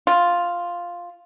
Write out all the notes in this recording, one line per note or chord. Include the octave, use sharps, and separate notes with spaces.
F4